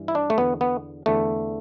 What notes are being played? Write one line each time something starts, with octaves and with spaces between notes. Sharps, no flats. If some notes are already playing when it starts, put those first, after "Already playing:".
Already playing: G2 E3
E4
D4
A3
E2 D3 B3
B3
E2 D3 A3